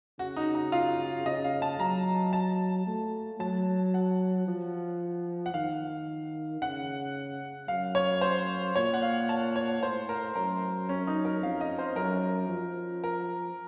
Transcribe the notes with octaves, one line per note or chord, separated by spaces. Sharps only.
C#3 F#4
D#4
D#4
F4
C#3 D#5
F5
A5
F#3 A#5
A5
A3
F#3 A5
F#5
F3
F#5
D#3 F5
C#3 F#5
F#2 F5
C#5
C5
A#2 C#5
F#5
F5
A5
C#5
A2 C5
A#4
F#2 A#4
C#4
D#4
A#4
F2 F5
D#5
C5
F#2 A#4
F3
A#4